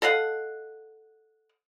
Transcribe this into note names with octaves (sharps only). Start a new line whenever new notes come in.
A4 D#5 F5 F#5